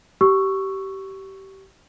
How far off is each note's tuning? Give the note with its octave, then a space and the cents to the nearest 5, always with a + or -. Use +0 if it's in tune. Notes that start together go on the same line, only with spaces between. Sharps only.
G4 -20 C#6 +0 E6 +10